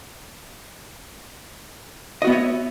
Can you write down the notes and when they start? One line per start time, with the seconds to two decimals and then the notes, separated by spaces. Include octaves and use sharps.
2.22 D#5
2.24 F#4
2.27 B3
2.30 E5
2.32 C#5